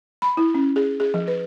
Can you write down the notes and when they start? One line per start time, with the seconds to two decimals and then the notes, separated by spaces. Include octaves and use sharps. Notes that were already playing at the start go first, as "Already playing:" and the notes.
0.22 B5
0.37 E4
0.55 C#4
0.76 G#4
1.00 G#4
1.14 F3
1.28 B4